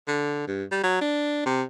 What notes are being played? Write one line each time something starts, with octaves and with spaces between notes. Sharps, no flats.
D3
G2
G3
F#3
D4
C3